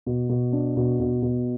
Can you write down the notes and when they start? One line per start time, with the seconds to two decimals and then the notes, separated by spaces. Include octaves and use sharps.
0.06 B2
0.29 B2
0.52 D4
0.77 B2
1.00 B2
1.22 B2